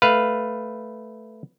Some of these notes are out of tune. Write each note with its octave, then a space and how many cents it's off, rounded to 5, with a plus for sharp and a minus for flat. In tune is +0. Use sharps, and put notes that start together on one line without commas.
A3 +0 B4 +0 F5 +0